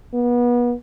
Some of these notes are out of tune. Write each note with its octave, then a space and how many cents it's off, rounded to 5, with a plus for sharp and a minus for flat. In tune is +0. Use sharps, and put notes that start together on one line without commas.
B3 -30